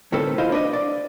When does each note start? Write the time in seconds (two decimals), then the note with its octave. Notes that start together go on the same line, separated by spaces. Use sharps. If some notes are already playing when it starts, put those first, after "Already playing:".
0.12 D2 A2 D#3 C4 A4 B4
0.38 E4 F4 C5 D#5 F5
0.52 D4 B4 D#5
0.73 D5